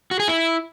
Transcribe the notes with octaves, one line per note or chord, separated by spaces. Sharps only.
F#4
G#4
E4